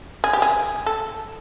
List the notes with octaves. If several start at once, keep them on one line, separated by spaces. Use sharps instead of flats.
G#4
G4
G#4
A4